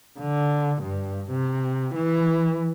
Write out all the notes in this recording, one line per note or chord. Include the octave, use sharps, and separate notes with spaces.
D3
G2
C3
E3